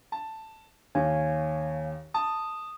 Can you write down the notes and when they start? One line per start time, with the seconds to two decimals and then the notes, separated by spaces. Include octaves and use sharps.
0.12 A5
0.95 D#2 C#5 F5 G#5
2.14 A5 D#6